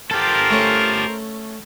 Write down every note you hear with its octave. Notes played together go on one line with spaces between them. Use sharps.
F4 G4 A4 A#4 C5
A3 C#4